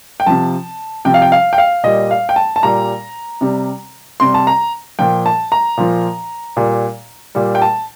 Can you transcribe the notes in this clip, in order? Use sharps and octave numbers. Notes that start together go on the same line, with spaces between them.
G5
C3 F3 A5
C3 F3 G5
F5
G5
F5
G5
F5
A#2 G3 D#5
F5
G5
A5
A5
A#2 G3 A#5
C3 G3
C3 G3 C6
A5
A#5
A#2 F3 G5
A5
A#5
A#2 F3
A#2 G3
A#2 G3
G5
A5